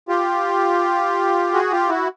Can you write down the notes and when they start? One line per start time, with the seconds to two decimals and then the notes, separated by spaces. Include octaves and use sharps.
0.08 F4 G4
1.53 F#4 G#4
1.71 F4 G4
1.89 E4 F#4